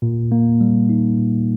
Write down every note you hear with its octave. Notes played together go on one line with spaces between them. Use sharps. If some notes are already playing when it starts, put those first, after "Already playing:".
A#2
A#3
G3
D#4
A#2